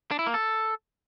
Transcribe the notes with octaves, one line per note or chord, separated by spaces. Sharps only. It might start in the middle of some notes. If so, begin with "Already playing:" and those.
D4
E4
A#3
A4